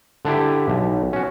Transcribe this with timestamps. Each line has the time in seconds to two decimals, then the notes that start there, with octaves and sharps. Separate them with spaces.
0.25 D3 D4 E4 G4
0.68 B1
1.13 C#4 F#4